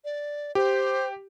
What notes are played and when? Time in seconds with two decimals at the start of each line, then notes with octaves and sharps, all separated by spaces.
0.04 D5
0.55 G4 C5